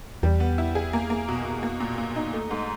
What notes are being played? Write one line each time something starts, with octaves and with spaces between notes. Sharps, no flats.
E2 G3
B3
E4
G#4
A#3
A#3
B2
B2
F2 A#3
A#2
A#2
D#4
E2 A3
G#2